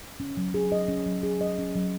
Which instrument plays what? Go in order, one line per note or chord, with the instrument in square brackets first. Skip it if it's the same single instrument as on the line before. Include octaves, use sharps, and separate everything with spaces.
[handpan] C#4
F#3
G#4
D#5
C#4
F#3
G#4
D#5
C#4
F#3